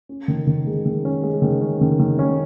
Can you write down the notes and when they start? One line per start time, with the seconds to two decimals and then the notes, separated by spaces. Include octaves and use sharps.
0.09 C#4
0.28 D#3
0.47 D#3
0.67 G#3
0.85 D#3
1.05 C#4
1.23 G#3
1.42 D#3
1.61 C#4
1.81 D#3
2.00 D#3
2.19 C#4